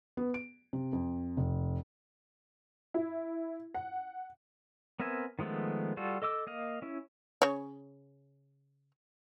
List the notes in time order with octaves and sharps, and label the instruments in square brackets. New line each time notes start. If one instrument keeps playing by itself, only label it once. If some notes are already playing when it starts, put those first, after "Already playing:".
[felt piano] B3
D7
C3
F2
F1
[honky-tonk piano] E4
F#5
[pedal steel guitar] B3 C4 A#4 E5 G#5
D#3 F3 G#3 A3 B3
G3 F4 F#4 A4
A4 D#5 D6 E6
A#3 D#5 F5
C#4 E4
[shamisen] C#3 C#5